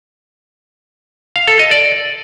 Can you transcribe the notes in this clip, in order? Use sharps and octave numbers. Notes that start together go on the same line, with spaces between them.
F5
A4
D#5
D5